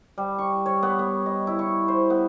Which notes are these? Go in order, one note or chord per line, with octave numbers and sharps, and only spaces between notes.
G3
C#6
C#5
B3
B3
D#5
E4
C#6
C5
B3